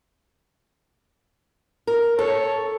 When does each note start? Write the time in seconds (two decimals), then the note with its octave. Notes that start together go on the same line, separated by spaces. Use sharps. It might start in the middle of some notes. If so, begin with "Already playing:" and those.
1.87 A#4
2.19 A4 C#5